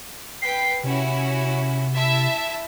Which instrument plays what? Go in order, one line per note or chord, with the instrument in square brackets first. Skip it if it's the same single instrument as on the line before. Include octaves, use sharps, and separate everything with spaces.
[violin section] B4 G5 B6 [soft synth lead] C7
[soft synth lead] C3 [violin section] C#4 E4 F#4
[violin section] E4 E5 A5